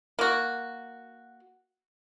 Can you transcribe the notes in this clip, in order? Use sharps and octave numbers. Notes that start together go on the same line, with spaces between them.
A#3 F#4